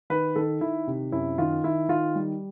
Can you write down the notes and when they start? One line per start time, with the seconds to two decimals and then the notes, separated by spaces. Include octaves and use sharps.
0.10 D#3 B4
0.35 D#3 A4
0.61 D#3 E4
0.87 C3
1.12 F#2 E4
1.38 D#3 F4
1.64 D#3 E4
1.89 D#3 F4
2.15 G3